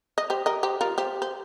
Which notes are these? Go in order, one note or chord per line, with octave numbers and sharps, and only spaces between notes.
D#5
G4 C5
A#4 D#5
G4 C5
F4 A#4
G4 C5
C5